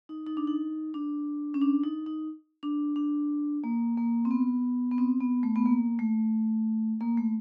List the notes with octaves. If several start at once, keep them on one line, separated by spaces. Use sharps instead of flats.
D#4
D#4
D4
D#4
D4
C#4
D4
D#4
D#4
D4
D4
A#3
A#3
C4
B3
B3
C4
B3
A3
B3
A#3
A3
A#3
A3